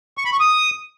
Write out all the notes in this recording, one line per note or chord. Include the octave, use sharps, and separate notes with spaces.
C#6
B5
C#6
D#6